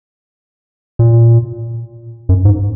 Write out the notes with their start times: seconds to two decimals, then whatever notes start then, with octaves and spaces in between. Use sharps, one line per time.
0.99 A#2
2.29 F#2
2.45 G#2